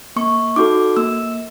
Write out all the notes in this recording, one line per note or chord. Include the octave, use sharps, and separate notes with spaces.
A#3 C#6
D#4 F#4 A4 D6
A#3 E6